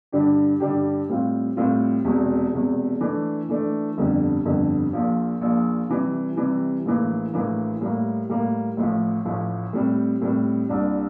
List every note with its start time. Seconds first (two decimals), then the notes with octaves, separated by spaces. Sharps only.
0.12 G2 D3 G3 D4 G4
0.60 G2 D3 G3 D4 G4
1.09 A2 G3 C4 F4
1.57 A2 G3 C4 F4
2.05 E1 E2 C3
2.53 E1 E2 C3
3.01 E3 A3 D4
3.49 E3 A3 D4
3.97 G1 F2 D3 G3
4.45 G1 F2 D3 G3
4.93 A#1 A#2 F3
5.41 A#1 A#2 F3
5.89 C3 E3 G3
6.37 C3 E3 G3
6.85 A#1 A2 E3 A#3
7.33 A#1 A2 E3 A#3
7.81 A2 G3 A#3
8.30 A2 G3 A#3
8.77 A1 A2 F3
9.25 A1 A2 F3
9.73 A2 G3 C4
10.22 A2 G3 C4
10.69 C2 A#2 G3 D4